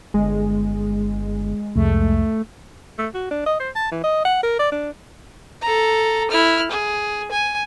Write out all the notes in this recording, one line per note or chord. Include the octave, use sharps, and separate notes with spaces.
G1 G#3
C2 F2 A3
A3
F#4
D4
D#5
C5
A5
E3
D#5
F#5
A#4
D5
D4
A4 A#5
E4 F6
G#4
G#5